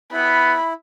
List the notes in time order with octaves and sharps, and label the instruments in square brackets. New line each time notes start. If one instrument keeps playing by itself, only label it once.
[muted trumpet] B3 [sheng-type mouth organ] E4 [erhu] B5